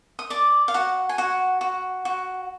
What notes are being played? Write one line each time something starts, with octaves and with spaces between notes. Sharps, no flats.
D#6
D5 D6
F5
F#4 F#5
G#5
F#4 F#5
F#4
F#4